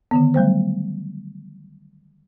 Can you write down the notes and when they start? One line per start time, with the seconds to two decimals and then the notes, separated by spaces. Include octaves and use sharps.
0.11 D3 D#3 B3
0.34 F#3 G3 A3 C5